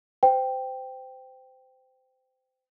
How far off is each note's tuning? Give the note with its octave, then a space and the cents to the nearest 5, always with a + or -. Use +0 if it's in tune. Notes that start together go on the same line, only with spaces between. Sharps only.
C5 -25 G5 +0